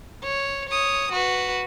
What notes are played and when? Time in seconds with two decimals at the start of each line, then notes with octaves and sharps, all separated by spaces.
0.23 C#5
0.69 C#5 D#6
1.12 F#4 B4